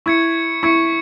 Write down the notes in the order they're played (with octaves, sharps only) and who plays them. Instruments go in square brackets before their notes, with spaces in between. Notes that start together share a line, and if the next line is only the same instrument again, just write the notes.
[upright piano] E4 [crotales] C#6 G#6 C#7
[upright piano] E4 [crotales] C#6 G#6 C#7